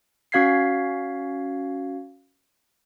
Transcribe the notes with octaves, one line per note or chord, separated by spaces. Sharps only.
C#4 F#4 F5 G#6 B6 C7